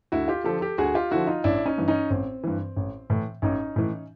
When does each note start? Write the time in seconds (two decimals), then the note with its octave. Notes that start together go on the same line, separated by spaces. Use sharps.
0.12 D2 E4 F#4
0.28 F4 G4
0.44 D3 F3 G4 A4
0.61 G4 A4
0.78 D2 F#4 G#4
0.94 F4 G4
1.11 D3 F3 E4 F#4
1.27 D#4 F4
1.44 A1 D4 E4
1.66 C#4 D#4
1.78 G2 E3
1.88 C#4 D#4
2.10 A1 C4
2.44 G2 E3
2.76 A1
3.10 A2 E3
3.42 A1 C#4 D#4
3.76 A2 E3